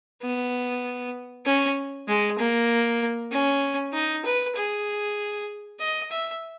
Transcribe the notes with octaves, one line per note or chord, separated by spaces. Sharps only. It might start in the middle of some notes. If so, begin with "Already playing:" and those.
B3
C#4
G#3
A#3
C#4
D#4
B4
G#4
D#5
E5